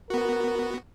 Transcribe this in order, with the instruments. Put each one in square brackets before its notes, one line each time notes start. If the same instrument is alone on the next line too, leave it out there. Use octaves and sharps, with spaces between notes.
[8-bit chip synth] B3 F#4 [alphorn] A#4